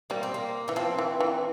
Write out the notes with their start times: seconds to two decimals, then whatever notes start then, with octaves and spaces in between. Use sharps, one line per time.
0.10 G3 A#3
0.23 C4
0.34 A#3
0.68 E3 A#3
0.76 F3 C4
0.98 E3
1.20 E3